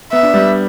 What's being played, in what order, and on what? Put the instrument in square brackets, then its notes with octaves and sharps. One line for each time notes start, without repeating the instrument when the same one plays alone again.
[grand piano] B3 [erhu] E5
[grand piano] D4
G3 B3